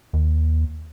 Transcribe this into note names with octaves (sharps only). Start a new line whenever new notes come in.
D#2